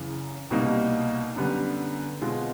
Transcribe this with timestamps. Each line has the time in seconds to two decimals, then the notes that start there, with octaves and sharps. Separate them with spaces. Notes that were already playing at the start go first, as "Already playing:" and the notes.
Already playing: F#1 F#2 C#3 E3
0.50 C2 B2 G3 A#3 D#4
1.36 F#2 D3 G3 B3
2.21 B2 G#3 C4 F4